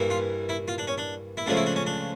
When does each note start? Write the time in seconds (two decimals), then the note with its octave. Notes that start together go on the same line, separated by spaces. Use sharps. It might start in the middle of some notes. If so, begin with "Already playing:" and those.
Already playing: G2 E3 A#3
0.10 F4
0.49 E4
0.68 F4
0.78 D4
0.87 C#4
0.98 D4
1.37 E4
1.46 C#2 C#3 F3 A3 D4
1.57 E4
1.66 D4
1.76 C#4
1.86 D4